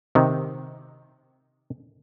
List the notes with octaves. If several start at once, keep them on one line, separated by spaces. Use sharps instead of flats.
C3 D#3